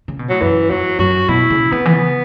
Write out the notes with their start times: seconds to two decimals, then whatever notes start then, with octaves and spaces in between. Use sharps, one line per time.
0.08 C#3
0.19 B2
0.29 A2 F#3
0.41 F#2 E3
0.70 E2 F#3
0.99 F#2 F#4
1.28 B2 E4
1.50 C#3
1.72 C#3 B3
1.85 E3
1.93 C#3